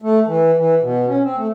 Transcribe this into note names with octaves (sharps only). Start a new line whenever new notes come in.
A3
E3
E3
B2
C#4
C4
A3